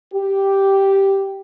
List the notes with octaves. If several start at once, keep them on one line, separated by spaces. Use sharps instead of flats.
G4